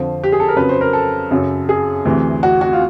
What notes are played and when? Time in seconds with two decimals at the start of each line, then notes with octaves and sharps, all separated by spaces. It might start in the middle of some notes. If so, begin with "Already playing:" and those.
Already playing: F2 D3 F3 C5
0.24 G4
0.32 G#4
0.40 A4
0.48 A#4
0.56 F2 C#3 F#3 B4
0.69 C5
0.81 A#4
0.93 A4
1.31 F#2 C#3 F#3
1.69 G#4
2.05 D2 C3 E3
2.43 F#4
2.61 F#4
2.73 F4